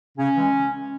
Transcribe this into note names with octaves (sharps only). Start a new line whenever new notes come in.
C#3 C#4
E3 G#3